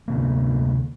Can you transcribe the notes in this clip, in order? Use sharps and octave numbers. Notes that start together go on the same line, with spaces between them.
D2 C3 A#3